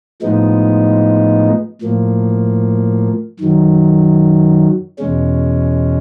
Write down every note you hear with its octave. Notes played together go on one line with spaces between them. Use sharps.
A2 F3 G#3 B3 D#4
A2 F3 A#3
F#2 D#3 F#3
E2 B2 G#3 C#4